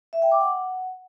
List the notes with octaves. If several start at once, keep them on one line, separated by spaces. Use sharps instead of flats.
E5
G5
D6
F#5